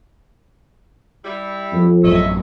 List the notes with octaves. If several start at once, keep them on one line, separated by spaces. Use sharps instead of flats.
G3 E4
F2
A1 F#2 F#3 C#5 D#5 E5